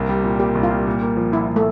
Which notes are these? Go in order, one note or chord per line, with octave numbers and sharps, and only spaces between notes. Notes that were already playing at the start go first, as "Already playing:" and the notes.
Already playing: C2 A#3
G3
A#2
A#3 G4
C2
F4
G3
A#2
A#3
F3
A#2 E4
A#2
A3